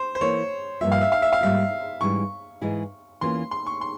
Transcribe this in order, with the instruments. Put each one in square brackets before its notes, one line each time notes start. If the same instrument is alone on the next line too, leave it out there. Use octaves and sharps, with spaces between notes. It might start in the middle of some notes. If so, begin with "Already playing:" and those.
Already playing: [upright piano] C5
C5
[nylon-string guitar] E3 A#3 E4 A#4 [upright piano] C#5
[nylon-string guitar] G2 F3 A#3 F4 [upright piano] E5
[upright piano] F5
E5
F5
E5
F5
[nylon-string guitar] G#2 G3 A#3 F4 [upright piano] E5
[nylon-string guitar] G#2 E3 G3 C#4 E4 [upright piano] C#6
[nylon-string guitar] G#2 E3 G#3 E4 G#4
[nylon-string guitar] E2 E3 A#3 C#4 F4 [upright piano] C6
[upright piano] C6
C#6
C6